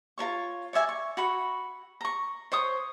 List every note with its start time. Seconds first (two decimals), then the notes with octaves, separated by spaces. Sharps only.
0.18 F4 A#4 C#5 C#6
0.73 C#5 D5 E5 G#5
0.89 C#6
1.17 F#4 B5 C#6
2.01 A#5 C#6
2.52 C5 C#5 C#6 D#6